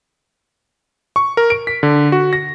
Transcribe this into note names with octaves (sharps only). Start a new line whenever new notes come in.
C#6
A#4
D7
B6
D3
F#4
A#6